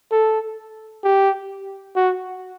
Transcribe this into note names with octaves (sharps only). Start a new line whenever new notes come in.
A4
G4
F#4